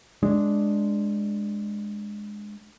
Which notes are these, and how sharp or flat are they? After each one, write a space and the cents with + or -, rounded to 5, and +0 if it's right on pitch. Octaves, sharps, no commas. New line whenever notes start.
G#3 +0 D4 +0